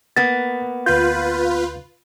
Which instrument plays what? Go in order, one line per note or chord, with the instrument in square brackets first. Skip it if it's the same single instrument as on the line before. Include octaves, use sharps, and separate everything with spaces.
[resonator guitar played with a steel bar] A#3 B3 [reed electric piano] A6
[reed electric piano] D2 G6 [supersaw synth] F4 B4